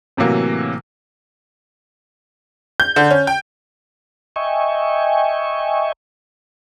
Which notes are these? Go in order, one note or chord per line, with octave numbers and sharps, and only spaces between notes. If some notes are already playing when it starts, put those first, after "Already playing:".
A2 C3 E3 F#3 A#3
G6
D3
C#4
G5
D#5 E5 G5 G#5 C#6